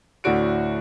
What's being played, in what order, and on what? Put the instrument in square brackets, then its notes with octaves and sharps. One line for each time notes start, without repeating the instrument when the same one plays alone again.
[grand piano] D2 A2 D4 F#4 D7